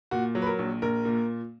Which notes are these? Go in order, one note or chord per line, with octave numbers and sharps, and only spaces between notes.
A#2 F#4
F#3
B4
A#4
A#1
A#1 A#4
A#2